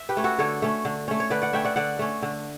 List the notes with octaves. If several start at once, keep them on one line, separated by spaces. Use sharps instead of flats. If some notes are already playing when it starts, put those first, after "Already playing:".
Already playing: E5
G4 B4
A3 C#4
F#4 A4
D3 A4 C#5
A3 C#4
D3
A3 C#4
C#5
D3 B4 D5
D5 F#5
A3 C#4 E5 G5
D5 F#5
D3 D5 F#5
A3 C#4
D3